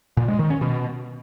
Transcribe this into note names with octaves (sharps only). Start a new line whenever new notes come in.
A#2
G#3
D#3
C#4
B2